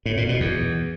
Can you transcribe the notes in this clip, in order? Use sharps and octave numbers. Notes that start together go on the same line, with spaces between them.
A2
A#2
B2
E2